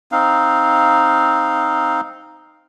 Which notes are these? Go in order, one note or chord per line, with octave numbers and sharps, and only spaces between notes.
C4 D#4 F5